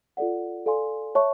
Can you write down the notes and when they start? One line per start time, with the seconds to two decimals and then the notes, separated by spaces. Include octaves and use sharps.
0.17 F4 A4 D5 F#5
0.66 A4 D5 F5 G#5 C6
1.15 C#5 E5 A5 C#6